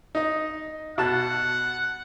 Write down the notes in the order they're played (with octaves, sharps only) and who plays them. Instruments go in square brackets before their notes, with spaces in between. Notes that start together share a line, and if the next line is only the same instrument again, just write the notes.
[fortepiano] D#4 D#5
[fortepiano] B2 A5 F#6 [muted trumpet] F#5